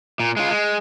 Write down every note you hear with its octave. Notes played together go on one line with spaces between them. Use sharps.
A#2
G#3 F4
G#3